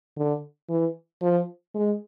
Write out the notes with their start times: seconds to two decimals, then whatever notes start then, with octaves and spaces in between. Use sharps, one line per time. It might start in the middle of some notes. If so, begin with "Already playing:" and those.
0.17 D3
0.69 E3
1.22 F3
1.75 G#3